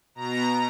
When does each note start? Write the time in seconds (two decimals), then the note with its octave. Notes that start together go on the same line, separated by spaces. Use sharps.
0.15 B2 A#5